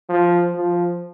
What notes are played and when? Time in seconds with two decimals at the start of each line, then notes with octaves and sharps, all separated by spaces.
0.09 F3
0.55 F3